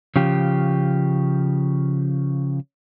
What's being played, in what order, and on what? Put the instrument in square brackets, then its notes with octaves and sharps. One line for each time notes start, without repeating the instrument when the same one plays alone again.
[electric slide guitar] C#3 F3 G4